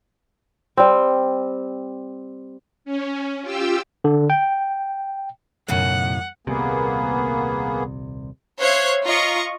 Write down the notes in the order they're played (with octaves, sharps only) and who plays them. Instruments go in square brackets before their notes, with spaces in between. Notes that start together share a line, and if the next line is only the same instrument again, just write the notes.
[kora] G3 C4
[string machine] C#4
F4 G4 G5 E6
[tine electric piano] D3
G5
[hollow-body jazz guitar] B1 [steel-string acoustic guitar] F#2 A2 C#3 [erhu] F#5
[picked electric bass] D#1 C2 C3 [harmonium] A#3 B3 G#4
[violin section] C5 C#5 E5 F5 F#6 G#6
F4 D#5 A#5 C#6